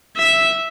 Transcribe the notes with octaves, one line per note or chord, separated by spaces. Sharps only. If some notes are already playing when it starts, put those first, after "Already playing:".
E5